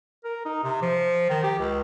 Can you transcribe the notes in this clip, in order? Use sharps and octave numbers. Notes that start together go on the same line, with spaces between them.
A#4
D#4
C3
F3
D#3
G4
C#2